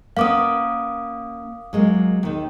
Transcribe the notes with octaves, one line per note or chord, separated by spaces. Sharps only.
A#3 B3 C#4 F5 D6 D#6
F#3 G#3 A#3
D#2 D#3